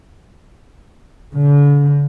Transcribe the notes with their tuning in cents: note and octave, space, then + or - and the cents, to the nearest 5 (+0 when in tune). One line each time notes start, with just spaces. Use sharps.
D3 -40